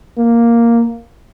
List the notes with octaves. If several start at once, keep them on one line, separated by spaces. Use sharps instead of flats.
A#3